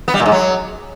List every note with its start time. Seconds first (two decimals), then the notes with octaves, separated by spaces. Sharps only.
0.08 B3
0.14 G3
0.20 A#2
0.26 G#2
0.32 F#3